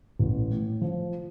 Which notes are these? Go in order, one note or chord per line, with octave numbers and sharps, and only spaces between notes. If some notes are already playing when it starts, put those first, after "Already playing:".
A1
A2
F3